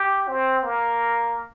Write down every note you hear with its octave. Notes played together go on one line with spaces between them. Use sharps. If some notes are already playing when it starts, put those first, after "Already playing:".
Already playing: G4
C4
A#3